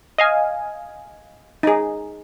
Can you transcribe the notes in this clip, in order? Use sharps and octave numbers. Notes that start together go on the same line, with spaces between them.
D#5 F5 G#5
D#4 G#4